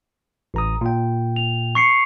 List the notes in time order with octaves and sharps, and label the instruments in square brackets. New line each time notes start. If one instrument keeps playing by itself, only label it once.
[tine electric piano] A1 A#5 D#6
A#2 G5
[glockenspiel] F7
C#6 C7 C#7